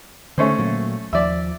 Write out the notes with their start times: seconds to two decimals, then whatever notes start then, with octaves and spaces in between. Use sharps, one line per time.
0.38 D3 A3 C#4 C5
0.59 A#2 F#3 A#3
1.13 D#2 F3 D5 E5